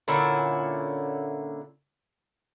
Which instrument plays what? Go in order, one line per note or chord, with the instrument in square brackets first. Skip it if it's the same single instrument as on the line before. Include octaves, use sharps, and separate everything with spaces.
[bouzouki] A#2 D3 C#4 E4